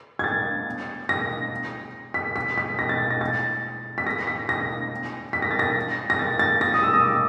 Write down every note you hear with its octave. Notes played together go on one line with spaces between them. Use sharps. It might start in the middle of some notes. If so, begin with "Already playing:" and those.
G#6
A6
A#6
B6
B6
B6
A#6
A6
A#6
A6
B6
A#6
B6
A#6
B6
A#6
A6
A#6
A#6
A6
A6
A#6
D#6
E6
D#6
D6